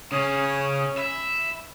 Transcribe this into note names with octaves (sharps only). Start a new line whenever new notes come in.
C#3 C#4 D#6
E5 B5